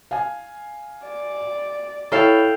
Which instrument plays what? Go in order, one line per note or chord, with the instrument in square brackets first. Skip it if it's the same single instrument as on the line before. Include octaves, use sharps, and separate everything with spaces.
[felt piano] F5 G#5
[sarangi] D5
[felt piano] E4 C#5 [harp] A4 F5 G5